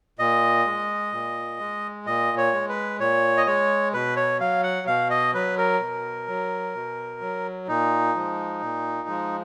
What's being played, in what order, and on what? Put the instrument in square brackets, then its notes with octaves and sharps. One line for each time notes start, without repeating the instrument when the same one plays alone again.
[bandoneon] A#2 D#5
G#3
A#2
G#3
A#2 D#5
C#5
G#3
B4
A#2 C#5
D#5
G#3 C#5
B2 B4
C#5
F#3 F5
F#5
B2 F5
D#5
F#3 B4
A#4
B2
F#3
B2
F#3
A#2 D#4
F3 G#3
A#2
F3 G#3